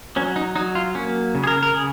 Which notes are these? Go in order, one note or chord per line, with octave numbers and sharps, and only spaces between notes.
F#3 C#4
D#4
F#3 D#4
F4
A#3 C#4
C#3
G#4
A#4
A#4
C#3 G#4